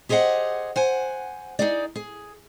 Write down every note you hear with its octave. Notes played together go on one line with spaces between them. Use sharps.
G4 G#4 C5 D#5 F#5
C5 F#5 G#5
D#4 G#4 D5
G#4